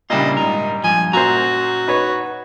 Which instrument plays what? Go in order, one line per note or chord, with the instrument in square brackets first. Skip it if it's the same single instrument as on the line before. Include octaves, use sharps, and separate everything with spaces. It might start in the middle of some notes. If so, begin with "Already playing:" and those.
[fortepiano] A#2 G3 D4 [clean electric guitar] C#3 E4 F4 [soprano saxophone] D#5
[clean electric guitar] G#2 A#4 [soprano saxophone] D#4
[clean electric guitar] G2 F3 [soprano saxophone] G#5
[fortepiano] F#2 A#2 C5 [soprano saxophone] F#4 [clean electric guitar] A#5
[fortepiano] D#4 B4 C#5